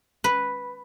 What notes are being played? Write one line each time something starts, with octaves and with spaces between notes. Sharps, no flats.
B4